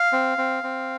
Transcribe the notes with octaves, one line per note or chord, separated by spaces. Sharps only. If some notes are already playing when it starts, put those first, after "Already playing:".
Already playing: F5
C4
C4
C4